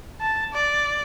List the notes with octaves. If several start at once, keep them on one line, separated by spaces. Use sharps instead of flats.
A5
D5